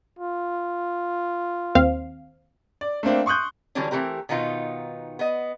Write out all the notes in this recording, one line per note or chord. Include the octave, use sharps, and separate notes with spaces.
F4
D#2 C4 F5
D5
A3 A#3 C4 D4
C6 C#6 D#6 F#6 G6
D3 E3 F#3 G3 C#4 D4
E3 A3 C4 G4 A#4
B2 D#3 B3 D#4 F4
B3 D#5